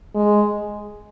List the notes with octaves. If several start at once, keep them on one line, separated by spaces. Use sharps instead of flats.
G#3